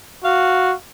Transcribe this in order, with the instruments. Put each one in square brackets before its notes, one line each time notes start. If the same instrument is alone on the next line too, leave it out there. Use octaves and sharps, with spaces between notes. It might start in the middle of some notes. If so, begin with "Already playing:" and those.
[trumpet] F#4 [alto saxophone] F5